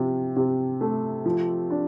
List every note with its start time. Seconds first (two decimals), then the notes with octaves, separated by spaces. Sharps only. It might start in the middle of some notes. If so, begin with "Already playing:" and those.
Already playing: C3 F3
0.36 C3
0.81 A3
1.26 F3
1.70 D4